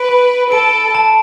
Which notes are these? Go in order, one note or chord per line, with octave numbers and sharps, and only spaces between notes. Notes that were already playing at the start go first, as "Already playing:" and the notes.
Already playing: B4 D7
B5
A4 D7
A5